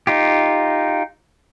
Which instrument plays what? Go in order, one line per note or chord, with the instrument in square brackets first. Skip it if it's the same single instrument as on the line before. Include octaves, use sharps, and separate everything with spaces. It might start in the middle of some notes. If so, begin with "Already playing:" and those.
[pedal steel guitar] D#4 F4 G4